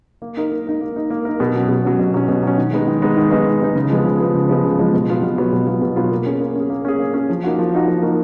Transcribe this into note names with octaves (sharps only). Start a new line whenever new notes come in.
A#3
D#4 A#4
A#3
D#4 A#4
A#3
D#4 A#4
A#3
D#4 A#4
B2
F#3 C#4
B2
F#3 C#4
B2
F#3 C#4
B2
F#3 C#4
D#3
G#3 B3 D#4
D#3
G#3 B3 D#4
D#3
G#3 B3 D#4
D#3
G#3 B3 D#4
C#3
F3 G#3 B3
C#3
F3 G#3 B3
C#3
F3 G#3 B3
C#3
F3 G#3 B3
B2
F#3 B3 F4
B2
F#3 B3 F4
B2
F#3 B3 F4
B2
F#3 B3 F4
A#3
C#4 G#4
A#3
C#4 G#4
A#3
C#4 G#4
A#3
C#4 G#4
F3
A#3 D#4 F#4
F3
A#3 D#4 F#4
F3
A#3 D#4 F#4